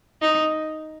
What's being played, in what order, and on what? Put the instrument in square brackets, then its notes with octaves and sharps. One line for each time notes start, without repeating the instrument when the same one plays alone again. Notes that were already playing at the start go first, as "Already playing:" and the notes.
[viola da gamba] D#4